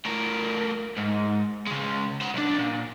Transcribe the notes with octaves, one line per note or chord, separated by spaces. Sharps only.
A2 A#4
G#2
C#3 G#3
C5 F#5
B1 D4
A#2